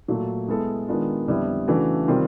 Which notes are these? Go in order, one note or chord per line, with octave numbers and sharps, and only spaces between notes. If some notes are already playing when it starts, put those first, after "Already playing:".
A#2 F#3 A3
G#3 B3 E4 A4
D#3 G#3 B3 D4 F4
F2 D3 G3 B3 E4
C#3 E3 A3 D4 F#4
C3 D#3 G3 C4 F4